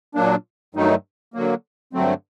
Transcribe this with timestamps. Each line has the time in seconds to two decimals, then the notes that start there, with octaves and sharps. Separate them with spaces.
0.15 A#2 F#3 A#3 D4
0.75 G2 D#3 F#3 A3 D#4
1.34 D3 F#3 A#3
1.93 G2 D3 F#3 A3 C4